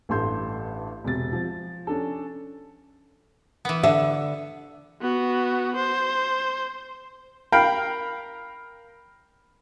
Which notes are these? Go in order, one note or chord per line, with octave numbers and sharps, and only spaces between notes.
A1 G2 A4 C6 G6
E1 C3 A6
F3
C#4 D4 A4
E3 B3
D3 E5
B3 F#4
C5
A#4 F5 G5 B5